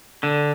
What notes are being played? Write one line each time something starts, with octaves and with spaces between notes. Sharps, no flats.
D3